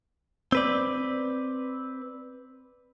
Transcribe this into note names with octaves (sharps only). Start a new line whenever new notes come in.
C4 B4 D5